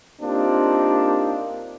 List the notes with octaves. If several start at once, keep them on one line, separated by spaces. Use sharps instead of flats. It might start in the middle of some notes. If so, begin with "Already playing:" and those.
A#3 C4 D4 D#4 F4 G4